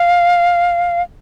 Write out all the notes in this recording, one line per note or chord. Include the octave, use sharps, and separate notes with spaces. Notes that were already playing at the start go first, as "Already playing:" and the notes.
Already playing: F5